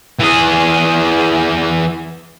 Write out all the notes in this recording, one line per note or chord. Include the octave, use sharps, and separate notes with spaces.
E3 G#4